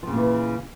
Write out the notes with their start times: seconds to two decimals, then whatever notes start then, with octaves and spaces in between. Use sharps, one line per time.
0.03 F3
0.07 C#3
0.12 A#2
0.17 E3